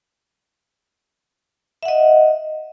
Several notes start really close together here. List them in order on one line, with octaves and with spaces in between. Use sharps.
E5 F#5 D#5